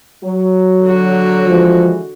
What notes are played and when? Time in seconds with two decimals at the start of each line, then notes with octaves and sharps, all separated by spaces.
0.24 F#3
0.84 D3 F#4
1.48 E3 F3 G#3